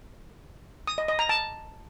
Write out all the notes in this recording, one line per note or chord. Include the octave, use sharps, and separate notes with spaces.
D#6
D#5
D#5
A#5
A5